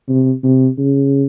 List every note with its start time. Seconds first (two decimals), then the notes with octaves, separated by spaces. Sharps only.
0.08 C3
0.43 C3
0.78 C#3